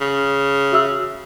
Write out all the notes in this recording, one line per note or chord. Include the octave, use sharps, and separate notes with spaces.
C#3
F#4 E5 E6